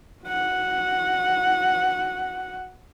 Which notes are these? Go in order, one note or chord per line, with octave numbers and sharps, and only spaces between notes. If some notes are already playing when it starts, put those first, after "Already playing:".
F#4 F#5